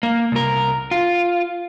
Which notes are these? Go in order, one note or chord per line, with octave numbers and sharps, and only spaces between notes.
A#3
C2 A#4
F4